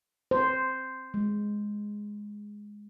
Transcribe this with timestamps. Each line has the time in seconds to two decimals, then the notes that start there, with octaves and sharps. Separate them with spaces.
0.31 C5
1.14 G#3